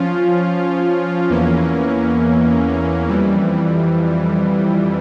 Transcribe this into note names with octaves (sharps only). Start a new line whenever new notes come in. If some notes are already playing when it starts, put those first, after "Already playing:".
Already playing: F3 C#4 F4
E2 E3 A#3 C#4
F2 E3 G3